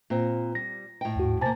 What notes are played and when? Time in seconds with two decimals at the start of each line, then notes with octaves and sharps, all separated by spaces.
0.10 A#2 C4
0.55 G3 A#6
1.01 A2 G5
1.16 D#2 G#2 F#4
1.41 C3 A#3 G#5 A5 A6